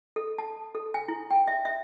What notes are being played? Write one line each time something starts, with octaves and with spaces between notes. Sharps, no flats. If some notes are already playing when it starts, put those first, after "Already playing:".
A4
A5
A4
G#5
E4
G5
E5
E5